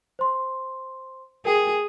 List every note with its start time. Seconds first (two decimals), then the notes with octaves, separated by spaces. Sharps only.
0.19 C5 C6
1.45 G#4 A#4 G5 G#5